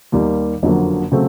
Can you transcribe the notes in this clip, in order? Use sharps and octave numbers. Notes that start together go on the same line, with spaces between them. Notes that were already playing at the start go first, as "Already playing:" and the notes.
D#2 D#3 G3 A#3
F#1 F2 D3 F#3 A#3
C#3 F#3 A3 C4